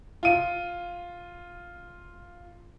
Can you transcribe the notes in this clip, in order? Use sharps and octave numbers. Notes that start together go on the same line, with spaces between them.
F4 D#7